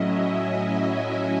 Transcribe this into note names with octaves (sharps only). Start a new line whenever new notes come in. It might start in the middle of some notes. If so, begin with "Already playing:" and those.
Already playing: A2 F#3 C#4 E4 D#5 E5
G#5
E5